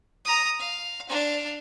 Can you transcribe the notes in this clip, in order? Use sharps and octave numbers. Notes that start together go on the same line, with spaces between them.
A#5 D#6
F5
D4 F5